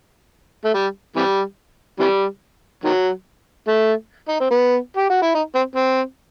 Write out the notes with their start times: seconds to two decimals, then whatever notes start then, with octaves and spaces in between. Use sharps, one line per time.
0.64 A3
0.74 G3
1.16 C3 E3 G3
1.99 C3 E3 G3
2.84 D#3 F#3
3.68 A3
4.28 D#4
4.40 C4
4.51 B3
4.97 G4
5.10 F#4
5.22 E4
5.35 D#4
5.55 C4
5.76 C4